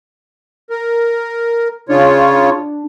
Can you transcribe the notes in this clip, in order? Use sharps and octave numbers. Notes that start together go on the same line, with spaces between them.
A#4
C#3 D4 F4 C#5